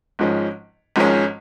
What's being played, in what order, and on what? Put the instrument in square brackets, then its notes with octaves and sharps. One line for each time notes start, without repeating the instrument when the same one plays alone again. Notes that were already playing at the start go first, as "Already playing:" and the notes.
[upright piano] G#1 G#2 F3 G#3 C#4
G#1 G#2 F3 G#3 C#4